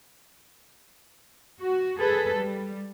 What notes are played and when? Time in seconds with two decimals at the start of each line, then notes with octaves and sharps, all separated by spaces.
1.59 F#4
1.98 G#4 A4 B4
2.34 G3